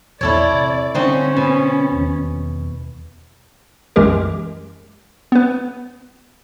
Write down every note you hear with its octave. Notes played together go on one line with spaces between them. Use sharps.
A#1 E2 B3 E4 A4 C#5 D5
C3
D3 G3 C4 C#4 D#4 F#4
B2
E1 D#2
C2 F#2 E3 G#3 G4 A#4
B3 B4